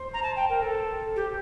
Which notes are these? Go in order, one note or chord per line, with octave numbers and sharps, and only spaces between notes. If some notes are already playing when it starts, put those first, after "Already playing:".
Already playing: C5
A#5
A5
G5
A#4
A4
G4